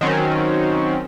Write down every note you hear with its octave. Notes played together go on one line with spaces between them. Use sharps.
D#3 F#3 C4 C#4